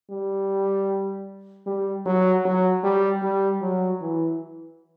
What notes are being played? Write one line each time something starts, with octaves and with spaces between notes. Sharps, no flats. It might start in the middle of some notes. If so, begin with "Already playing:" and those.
G3
G3
F#3
F#3
G3
G3
F#3
E3